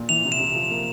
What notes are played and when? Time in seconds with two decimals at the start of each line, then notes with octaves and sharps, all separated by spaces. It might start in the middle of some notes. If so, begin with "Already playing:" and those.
Already playing: A#2
0.09 E3 F7
0.25 C3
0.32 E7
0.40 C3
0.55 F3
0.71 A#3